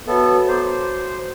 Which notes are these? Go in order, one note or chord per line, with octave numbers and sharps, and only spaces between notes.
B3 F#4 A4 C#5 E5
C5 A#5 D6 G6